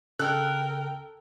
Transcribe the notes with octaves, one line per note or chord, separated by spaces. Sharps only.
C#3 A4 A#4 G5 F6 F#6